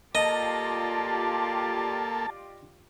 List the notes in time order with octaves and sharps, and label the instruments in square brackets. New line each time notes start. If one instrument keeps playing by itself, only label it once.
[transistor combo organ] A#3 A4 [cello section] F4 G4 D5 [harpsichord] D#5 [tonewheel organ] A5